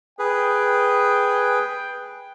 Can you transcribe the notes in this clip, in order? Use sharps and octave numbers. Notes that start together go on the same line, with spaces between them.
G#4 B4 G5